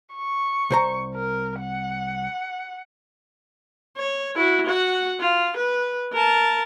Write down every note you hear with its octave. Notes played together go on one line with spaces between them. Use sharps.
C#6
C2 C5 A#5
A#4
F#5
C#5
E4 F#4
F#4 F#5
F4
B4
A#4 A5